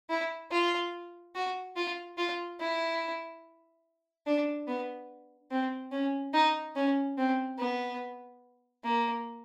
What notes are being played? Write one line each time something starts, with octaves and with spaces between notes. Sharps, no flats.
E4
F4
F#4
F4
F4
E4
D4
B3
C4
C#4
D#4
C#4
C4
B3
A#3